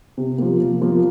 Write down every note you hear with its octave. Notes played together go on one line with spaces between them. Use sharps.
C3
F3 A#3
C3
F3 A#3